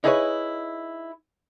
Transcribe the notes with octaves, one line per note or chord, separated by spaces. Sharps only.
D#4 E4 G#4 A#4 B4 C#5